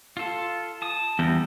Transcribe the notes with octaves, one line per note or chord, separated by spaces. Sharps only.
F4 A4
A5 D#6
E2 G3 G6